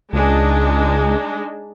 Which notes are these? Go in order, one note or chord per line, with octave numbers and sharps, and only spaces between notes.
C#2 G#3 D4 D#4